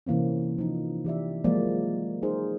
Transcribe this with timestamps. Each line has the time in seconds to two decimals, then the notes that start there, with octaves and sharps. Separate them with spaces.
0.06 C3 E3 A#3 C4 C#4
0.58 F3 D#4
1.05 E3 G4 D5 E5
1.44 F3 F#3 G#3 A#3 D5
2.22 D#4 G#4 A#4 C5